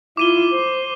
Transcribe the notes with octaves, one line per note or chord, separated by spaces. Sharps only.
E4 F4 D6 D#7 G7
C5